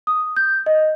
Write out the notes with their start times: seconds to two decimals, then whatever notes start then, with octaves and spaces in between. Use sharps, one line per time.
0.07 D#6
0.36 G6
0.66 D#5